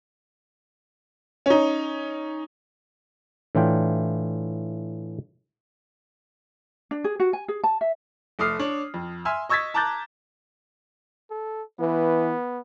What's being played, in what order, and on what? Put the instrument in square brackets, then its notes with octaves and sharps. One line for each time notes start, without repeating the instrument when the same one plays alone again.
[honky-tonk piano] C#4 D#4
[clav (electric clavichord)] A2 E3 D4 F4 G5
[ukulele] D4
G#4
F#4
G#5
G#4
A5
E5
[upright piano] F1 A3 D6 D#6 F6 C7
D4 C#5
F2
E5 G#5 C6 E6 F6
D#5 C#6 E6 G#6 A6 B6
A5 A#5 D6 F#6 G6 A6
[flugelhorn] A4
[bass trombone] E3 [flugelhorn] B3